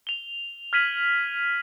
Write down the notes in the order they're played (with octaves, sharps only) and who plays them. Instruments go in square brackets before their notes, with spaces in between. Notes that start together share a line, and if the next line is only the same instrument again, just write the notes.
[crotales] F7 G7
F6 G#6 B6 D#7 F#7